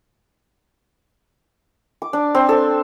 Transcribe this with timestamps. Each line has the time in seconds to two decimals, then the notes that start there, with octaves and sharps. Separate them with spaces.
2.02 D6
2.13 D4
2.35 C4
2.49 A4